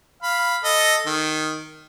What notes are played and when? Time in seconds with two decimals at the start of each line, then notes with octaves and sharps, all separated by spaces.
0.23 F5 B5
0.64 A4 D#5
1.06 D#3